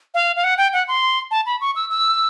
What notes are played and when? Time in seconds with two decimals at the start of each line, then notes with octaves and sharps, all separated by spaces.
0.14 F5
0.36 F5
0.44 F#5
0.58 G5
0.73 F#5
0.88 C6
1.31 A5
1.46 B5
1.61 C#6
1.76 E6
1.90 E6